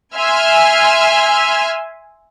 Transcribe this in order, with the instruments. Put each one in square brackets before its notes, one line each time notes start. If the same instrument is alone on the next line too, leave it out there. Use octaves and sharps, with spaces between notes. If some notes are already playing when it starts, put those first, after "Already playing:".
[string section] E5 G#5 C6 F6